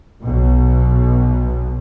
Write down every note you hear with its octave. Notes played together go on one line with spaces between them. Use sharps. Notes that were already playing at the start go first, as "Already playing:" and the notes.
B1 B2